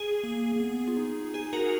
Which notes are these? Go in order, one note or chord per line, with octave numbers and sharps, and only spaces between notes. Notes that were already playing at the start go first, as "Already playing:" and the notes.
Already playing: G#4
A#3
A#3
B3
F4
D#4
G#4
F#4 A#4